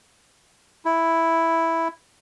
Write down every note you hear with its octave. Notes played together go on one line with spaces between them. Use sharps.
E4